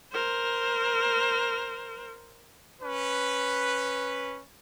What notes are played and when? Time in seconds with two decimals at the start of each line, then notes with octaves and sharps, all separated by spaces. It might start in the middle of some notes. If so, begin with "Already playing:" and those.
0.12 A#4 C5
2.82 C#4 B4